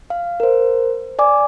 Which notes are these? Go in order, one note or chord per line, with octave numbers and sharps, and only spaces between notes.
F5
A#4 C5
D5 G#5 D6